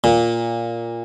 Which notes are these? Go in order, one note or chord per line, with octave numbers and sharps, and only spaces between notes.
A#2